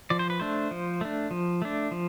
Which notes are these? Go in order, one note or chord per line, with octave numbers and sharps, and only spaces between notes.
F3 D5
C5
B4
A3 D4 C5
F3
A3 D4
F3
A3 D4
F3